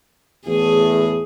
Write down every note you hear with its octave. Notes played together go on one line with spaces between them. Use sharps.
E2 A2 A3 G#4